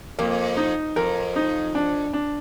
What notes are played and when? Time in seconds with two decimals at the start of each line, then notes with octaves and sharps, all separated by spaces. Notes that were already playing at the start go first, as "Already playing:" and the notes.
0.19 F2 A#3
0.57 D#4
0.96 F2 A#4
1.36 D#4
1.75 D4
2.13 D4